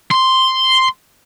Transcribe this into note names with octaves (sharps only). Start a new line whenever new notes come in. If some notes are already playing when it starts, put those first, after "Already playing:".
C6